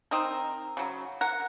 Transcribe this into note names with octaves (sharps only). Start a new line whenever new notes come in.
C4 D#4 A#4
C#3 F#3
A#4 F#5